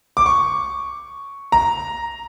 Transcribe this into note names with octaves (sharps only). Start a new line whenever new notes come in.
D6
C#6
A#5